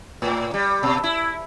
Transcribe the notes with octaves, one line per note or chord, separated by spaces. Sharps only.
A2
G3
B2
E4